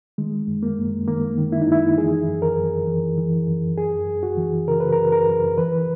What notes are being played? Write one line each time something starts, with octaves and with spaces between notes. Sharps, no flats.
D#3 G#3
F#2
A#3
F#2
D#3 A#3
D#3
E4
D#4
F#2 E4
E3 G#4
F#2
A#4
F#2
E3
E3
F#2
F#2 G#4
F#2
F#4
E3
C#3 A#4
B4
F#2 A#4
A#4
F#2
E3 B4